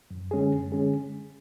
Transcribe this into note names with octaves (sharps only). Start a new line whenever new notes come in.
F#2
D3 G#3 C#4 G#4
F#2
D3 G#3 C#4 G#4